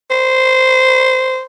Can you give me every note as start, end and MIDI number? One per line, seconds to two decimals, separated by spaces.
0.11 1.43 72